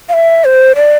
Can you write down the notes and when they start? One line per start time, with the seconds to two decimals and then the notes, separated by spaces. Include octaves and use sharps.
0.09 F5
0.13 E5
0.45 C5
0.76 D5